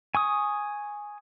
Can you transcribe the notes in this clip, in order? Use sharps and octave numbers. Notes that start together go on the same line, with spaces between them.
G#5 C#6 D#6